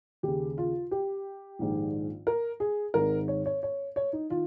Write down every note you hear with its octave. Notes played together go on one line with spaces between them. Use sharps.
D#2 C#3 G4
F4
G4
A#1 G#2 D#3
A#4
G#4
G#1 G#2 D#3 A#4
C#5
C#5
C#5
C#5
D#4
D#3 F4